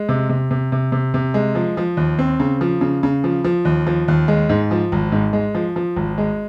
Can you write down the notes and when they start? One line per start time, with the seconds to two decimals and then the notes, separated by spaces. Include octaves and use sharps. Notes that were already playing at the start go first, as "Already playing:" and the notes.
Already playing: G#3
0.09 C3
0.29 C3
0.51 C3
0.72 C3
0.92 C3
1.14 C3
1.34 G#3
1.55 F3
1.77 F3
1.97 D#2
2.19 C4
2.40 C#3
2.61 F3
2.81 C#3
3.03 C#3
3.24 F3
3.44 F3
3.65 D#2
3.86 F3
4.08 D#2
4.28 G#3
4.49 G#2
4.71 F3
4.92 G#1
5.12 G#2
5.33 G#3
5.55 F3
5.76 F3
5.96 G#1
6.18 G#3